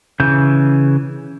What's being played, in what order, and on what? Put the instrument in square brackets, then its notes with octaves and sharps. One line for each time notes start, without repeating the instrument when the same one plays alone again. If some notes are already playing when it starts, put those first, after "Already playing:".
[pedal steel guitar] C#3 E3 G6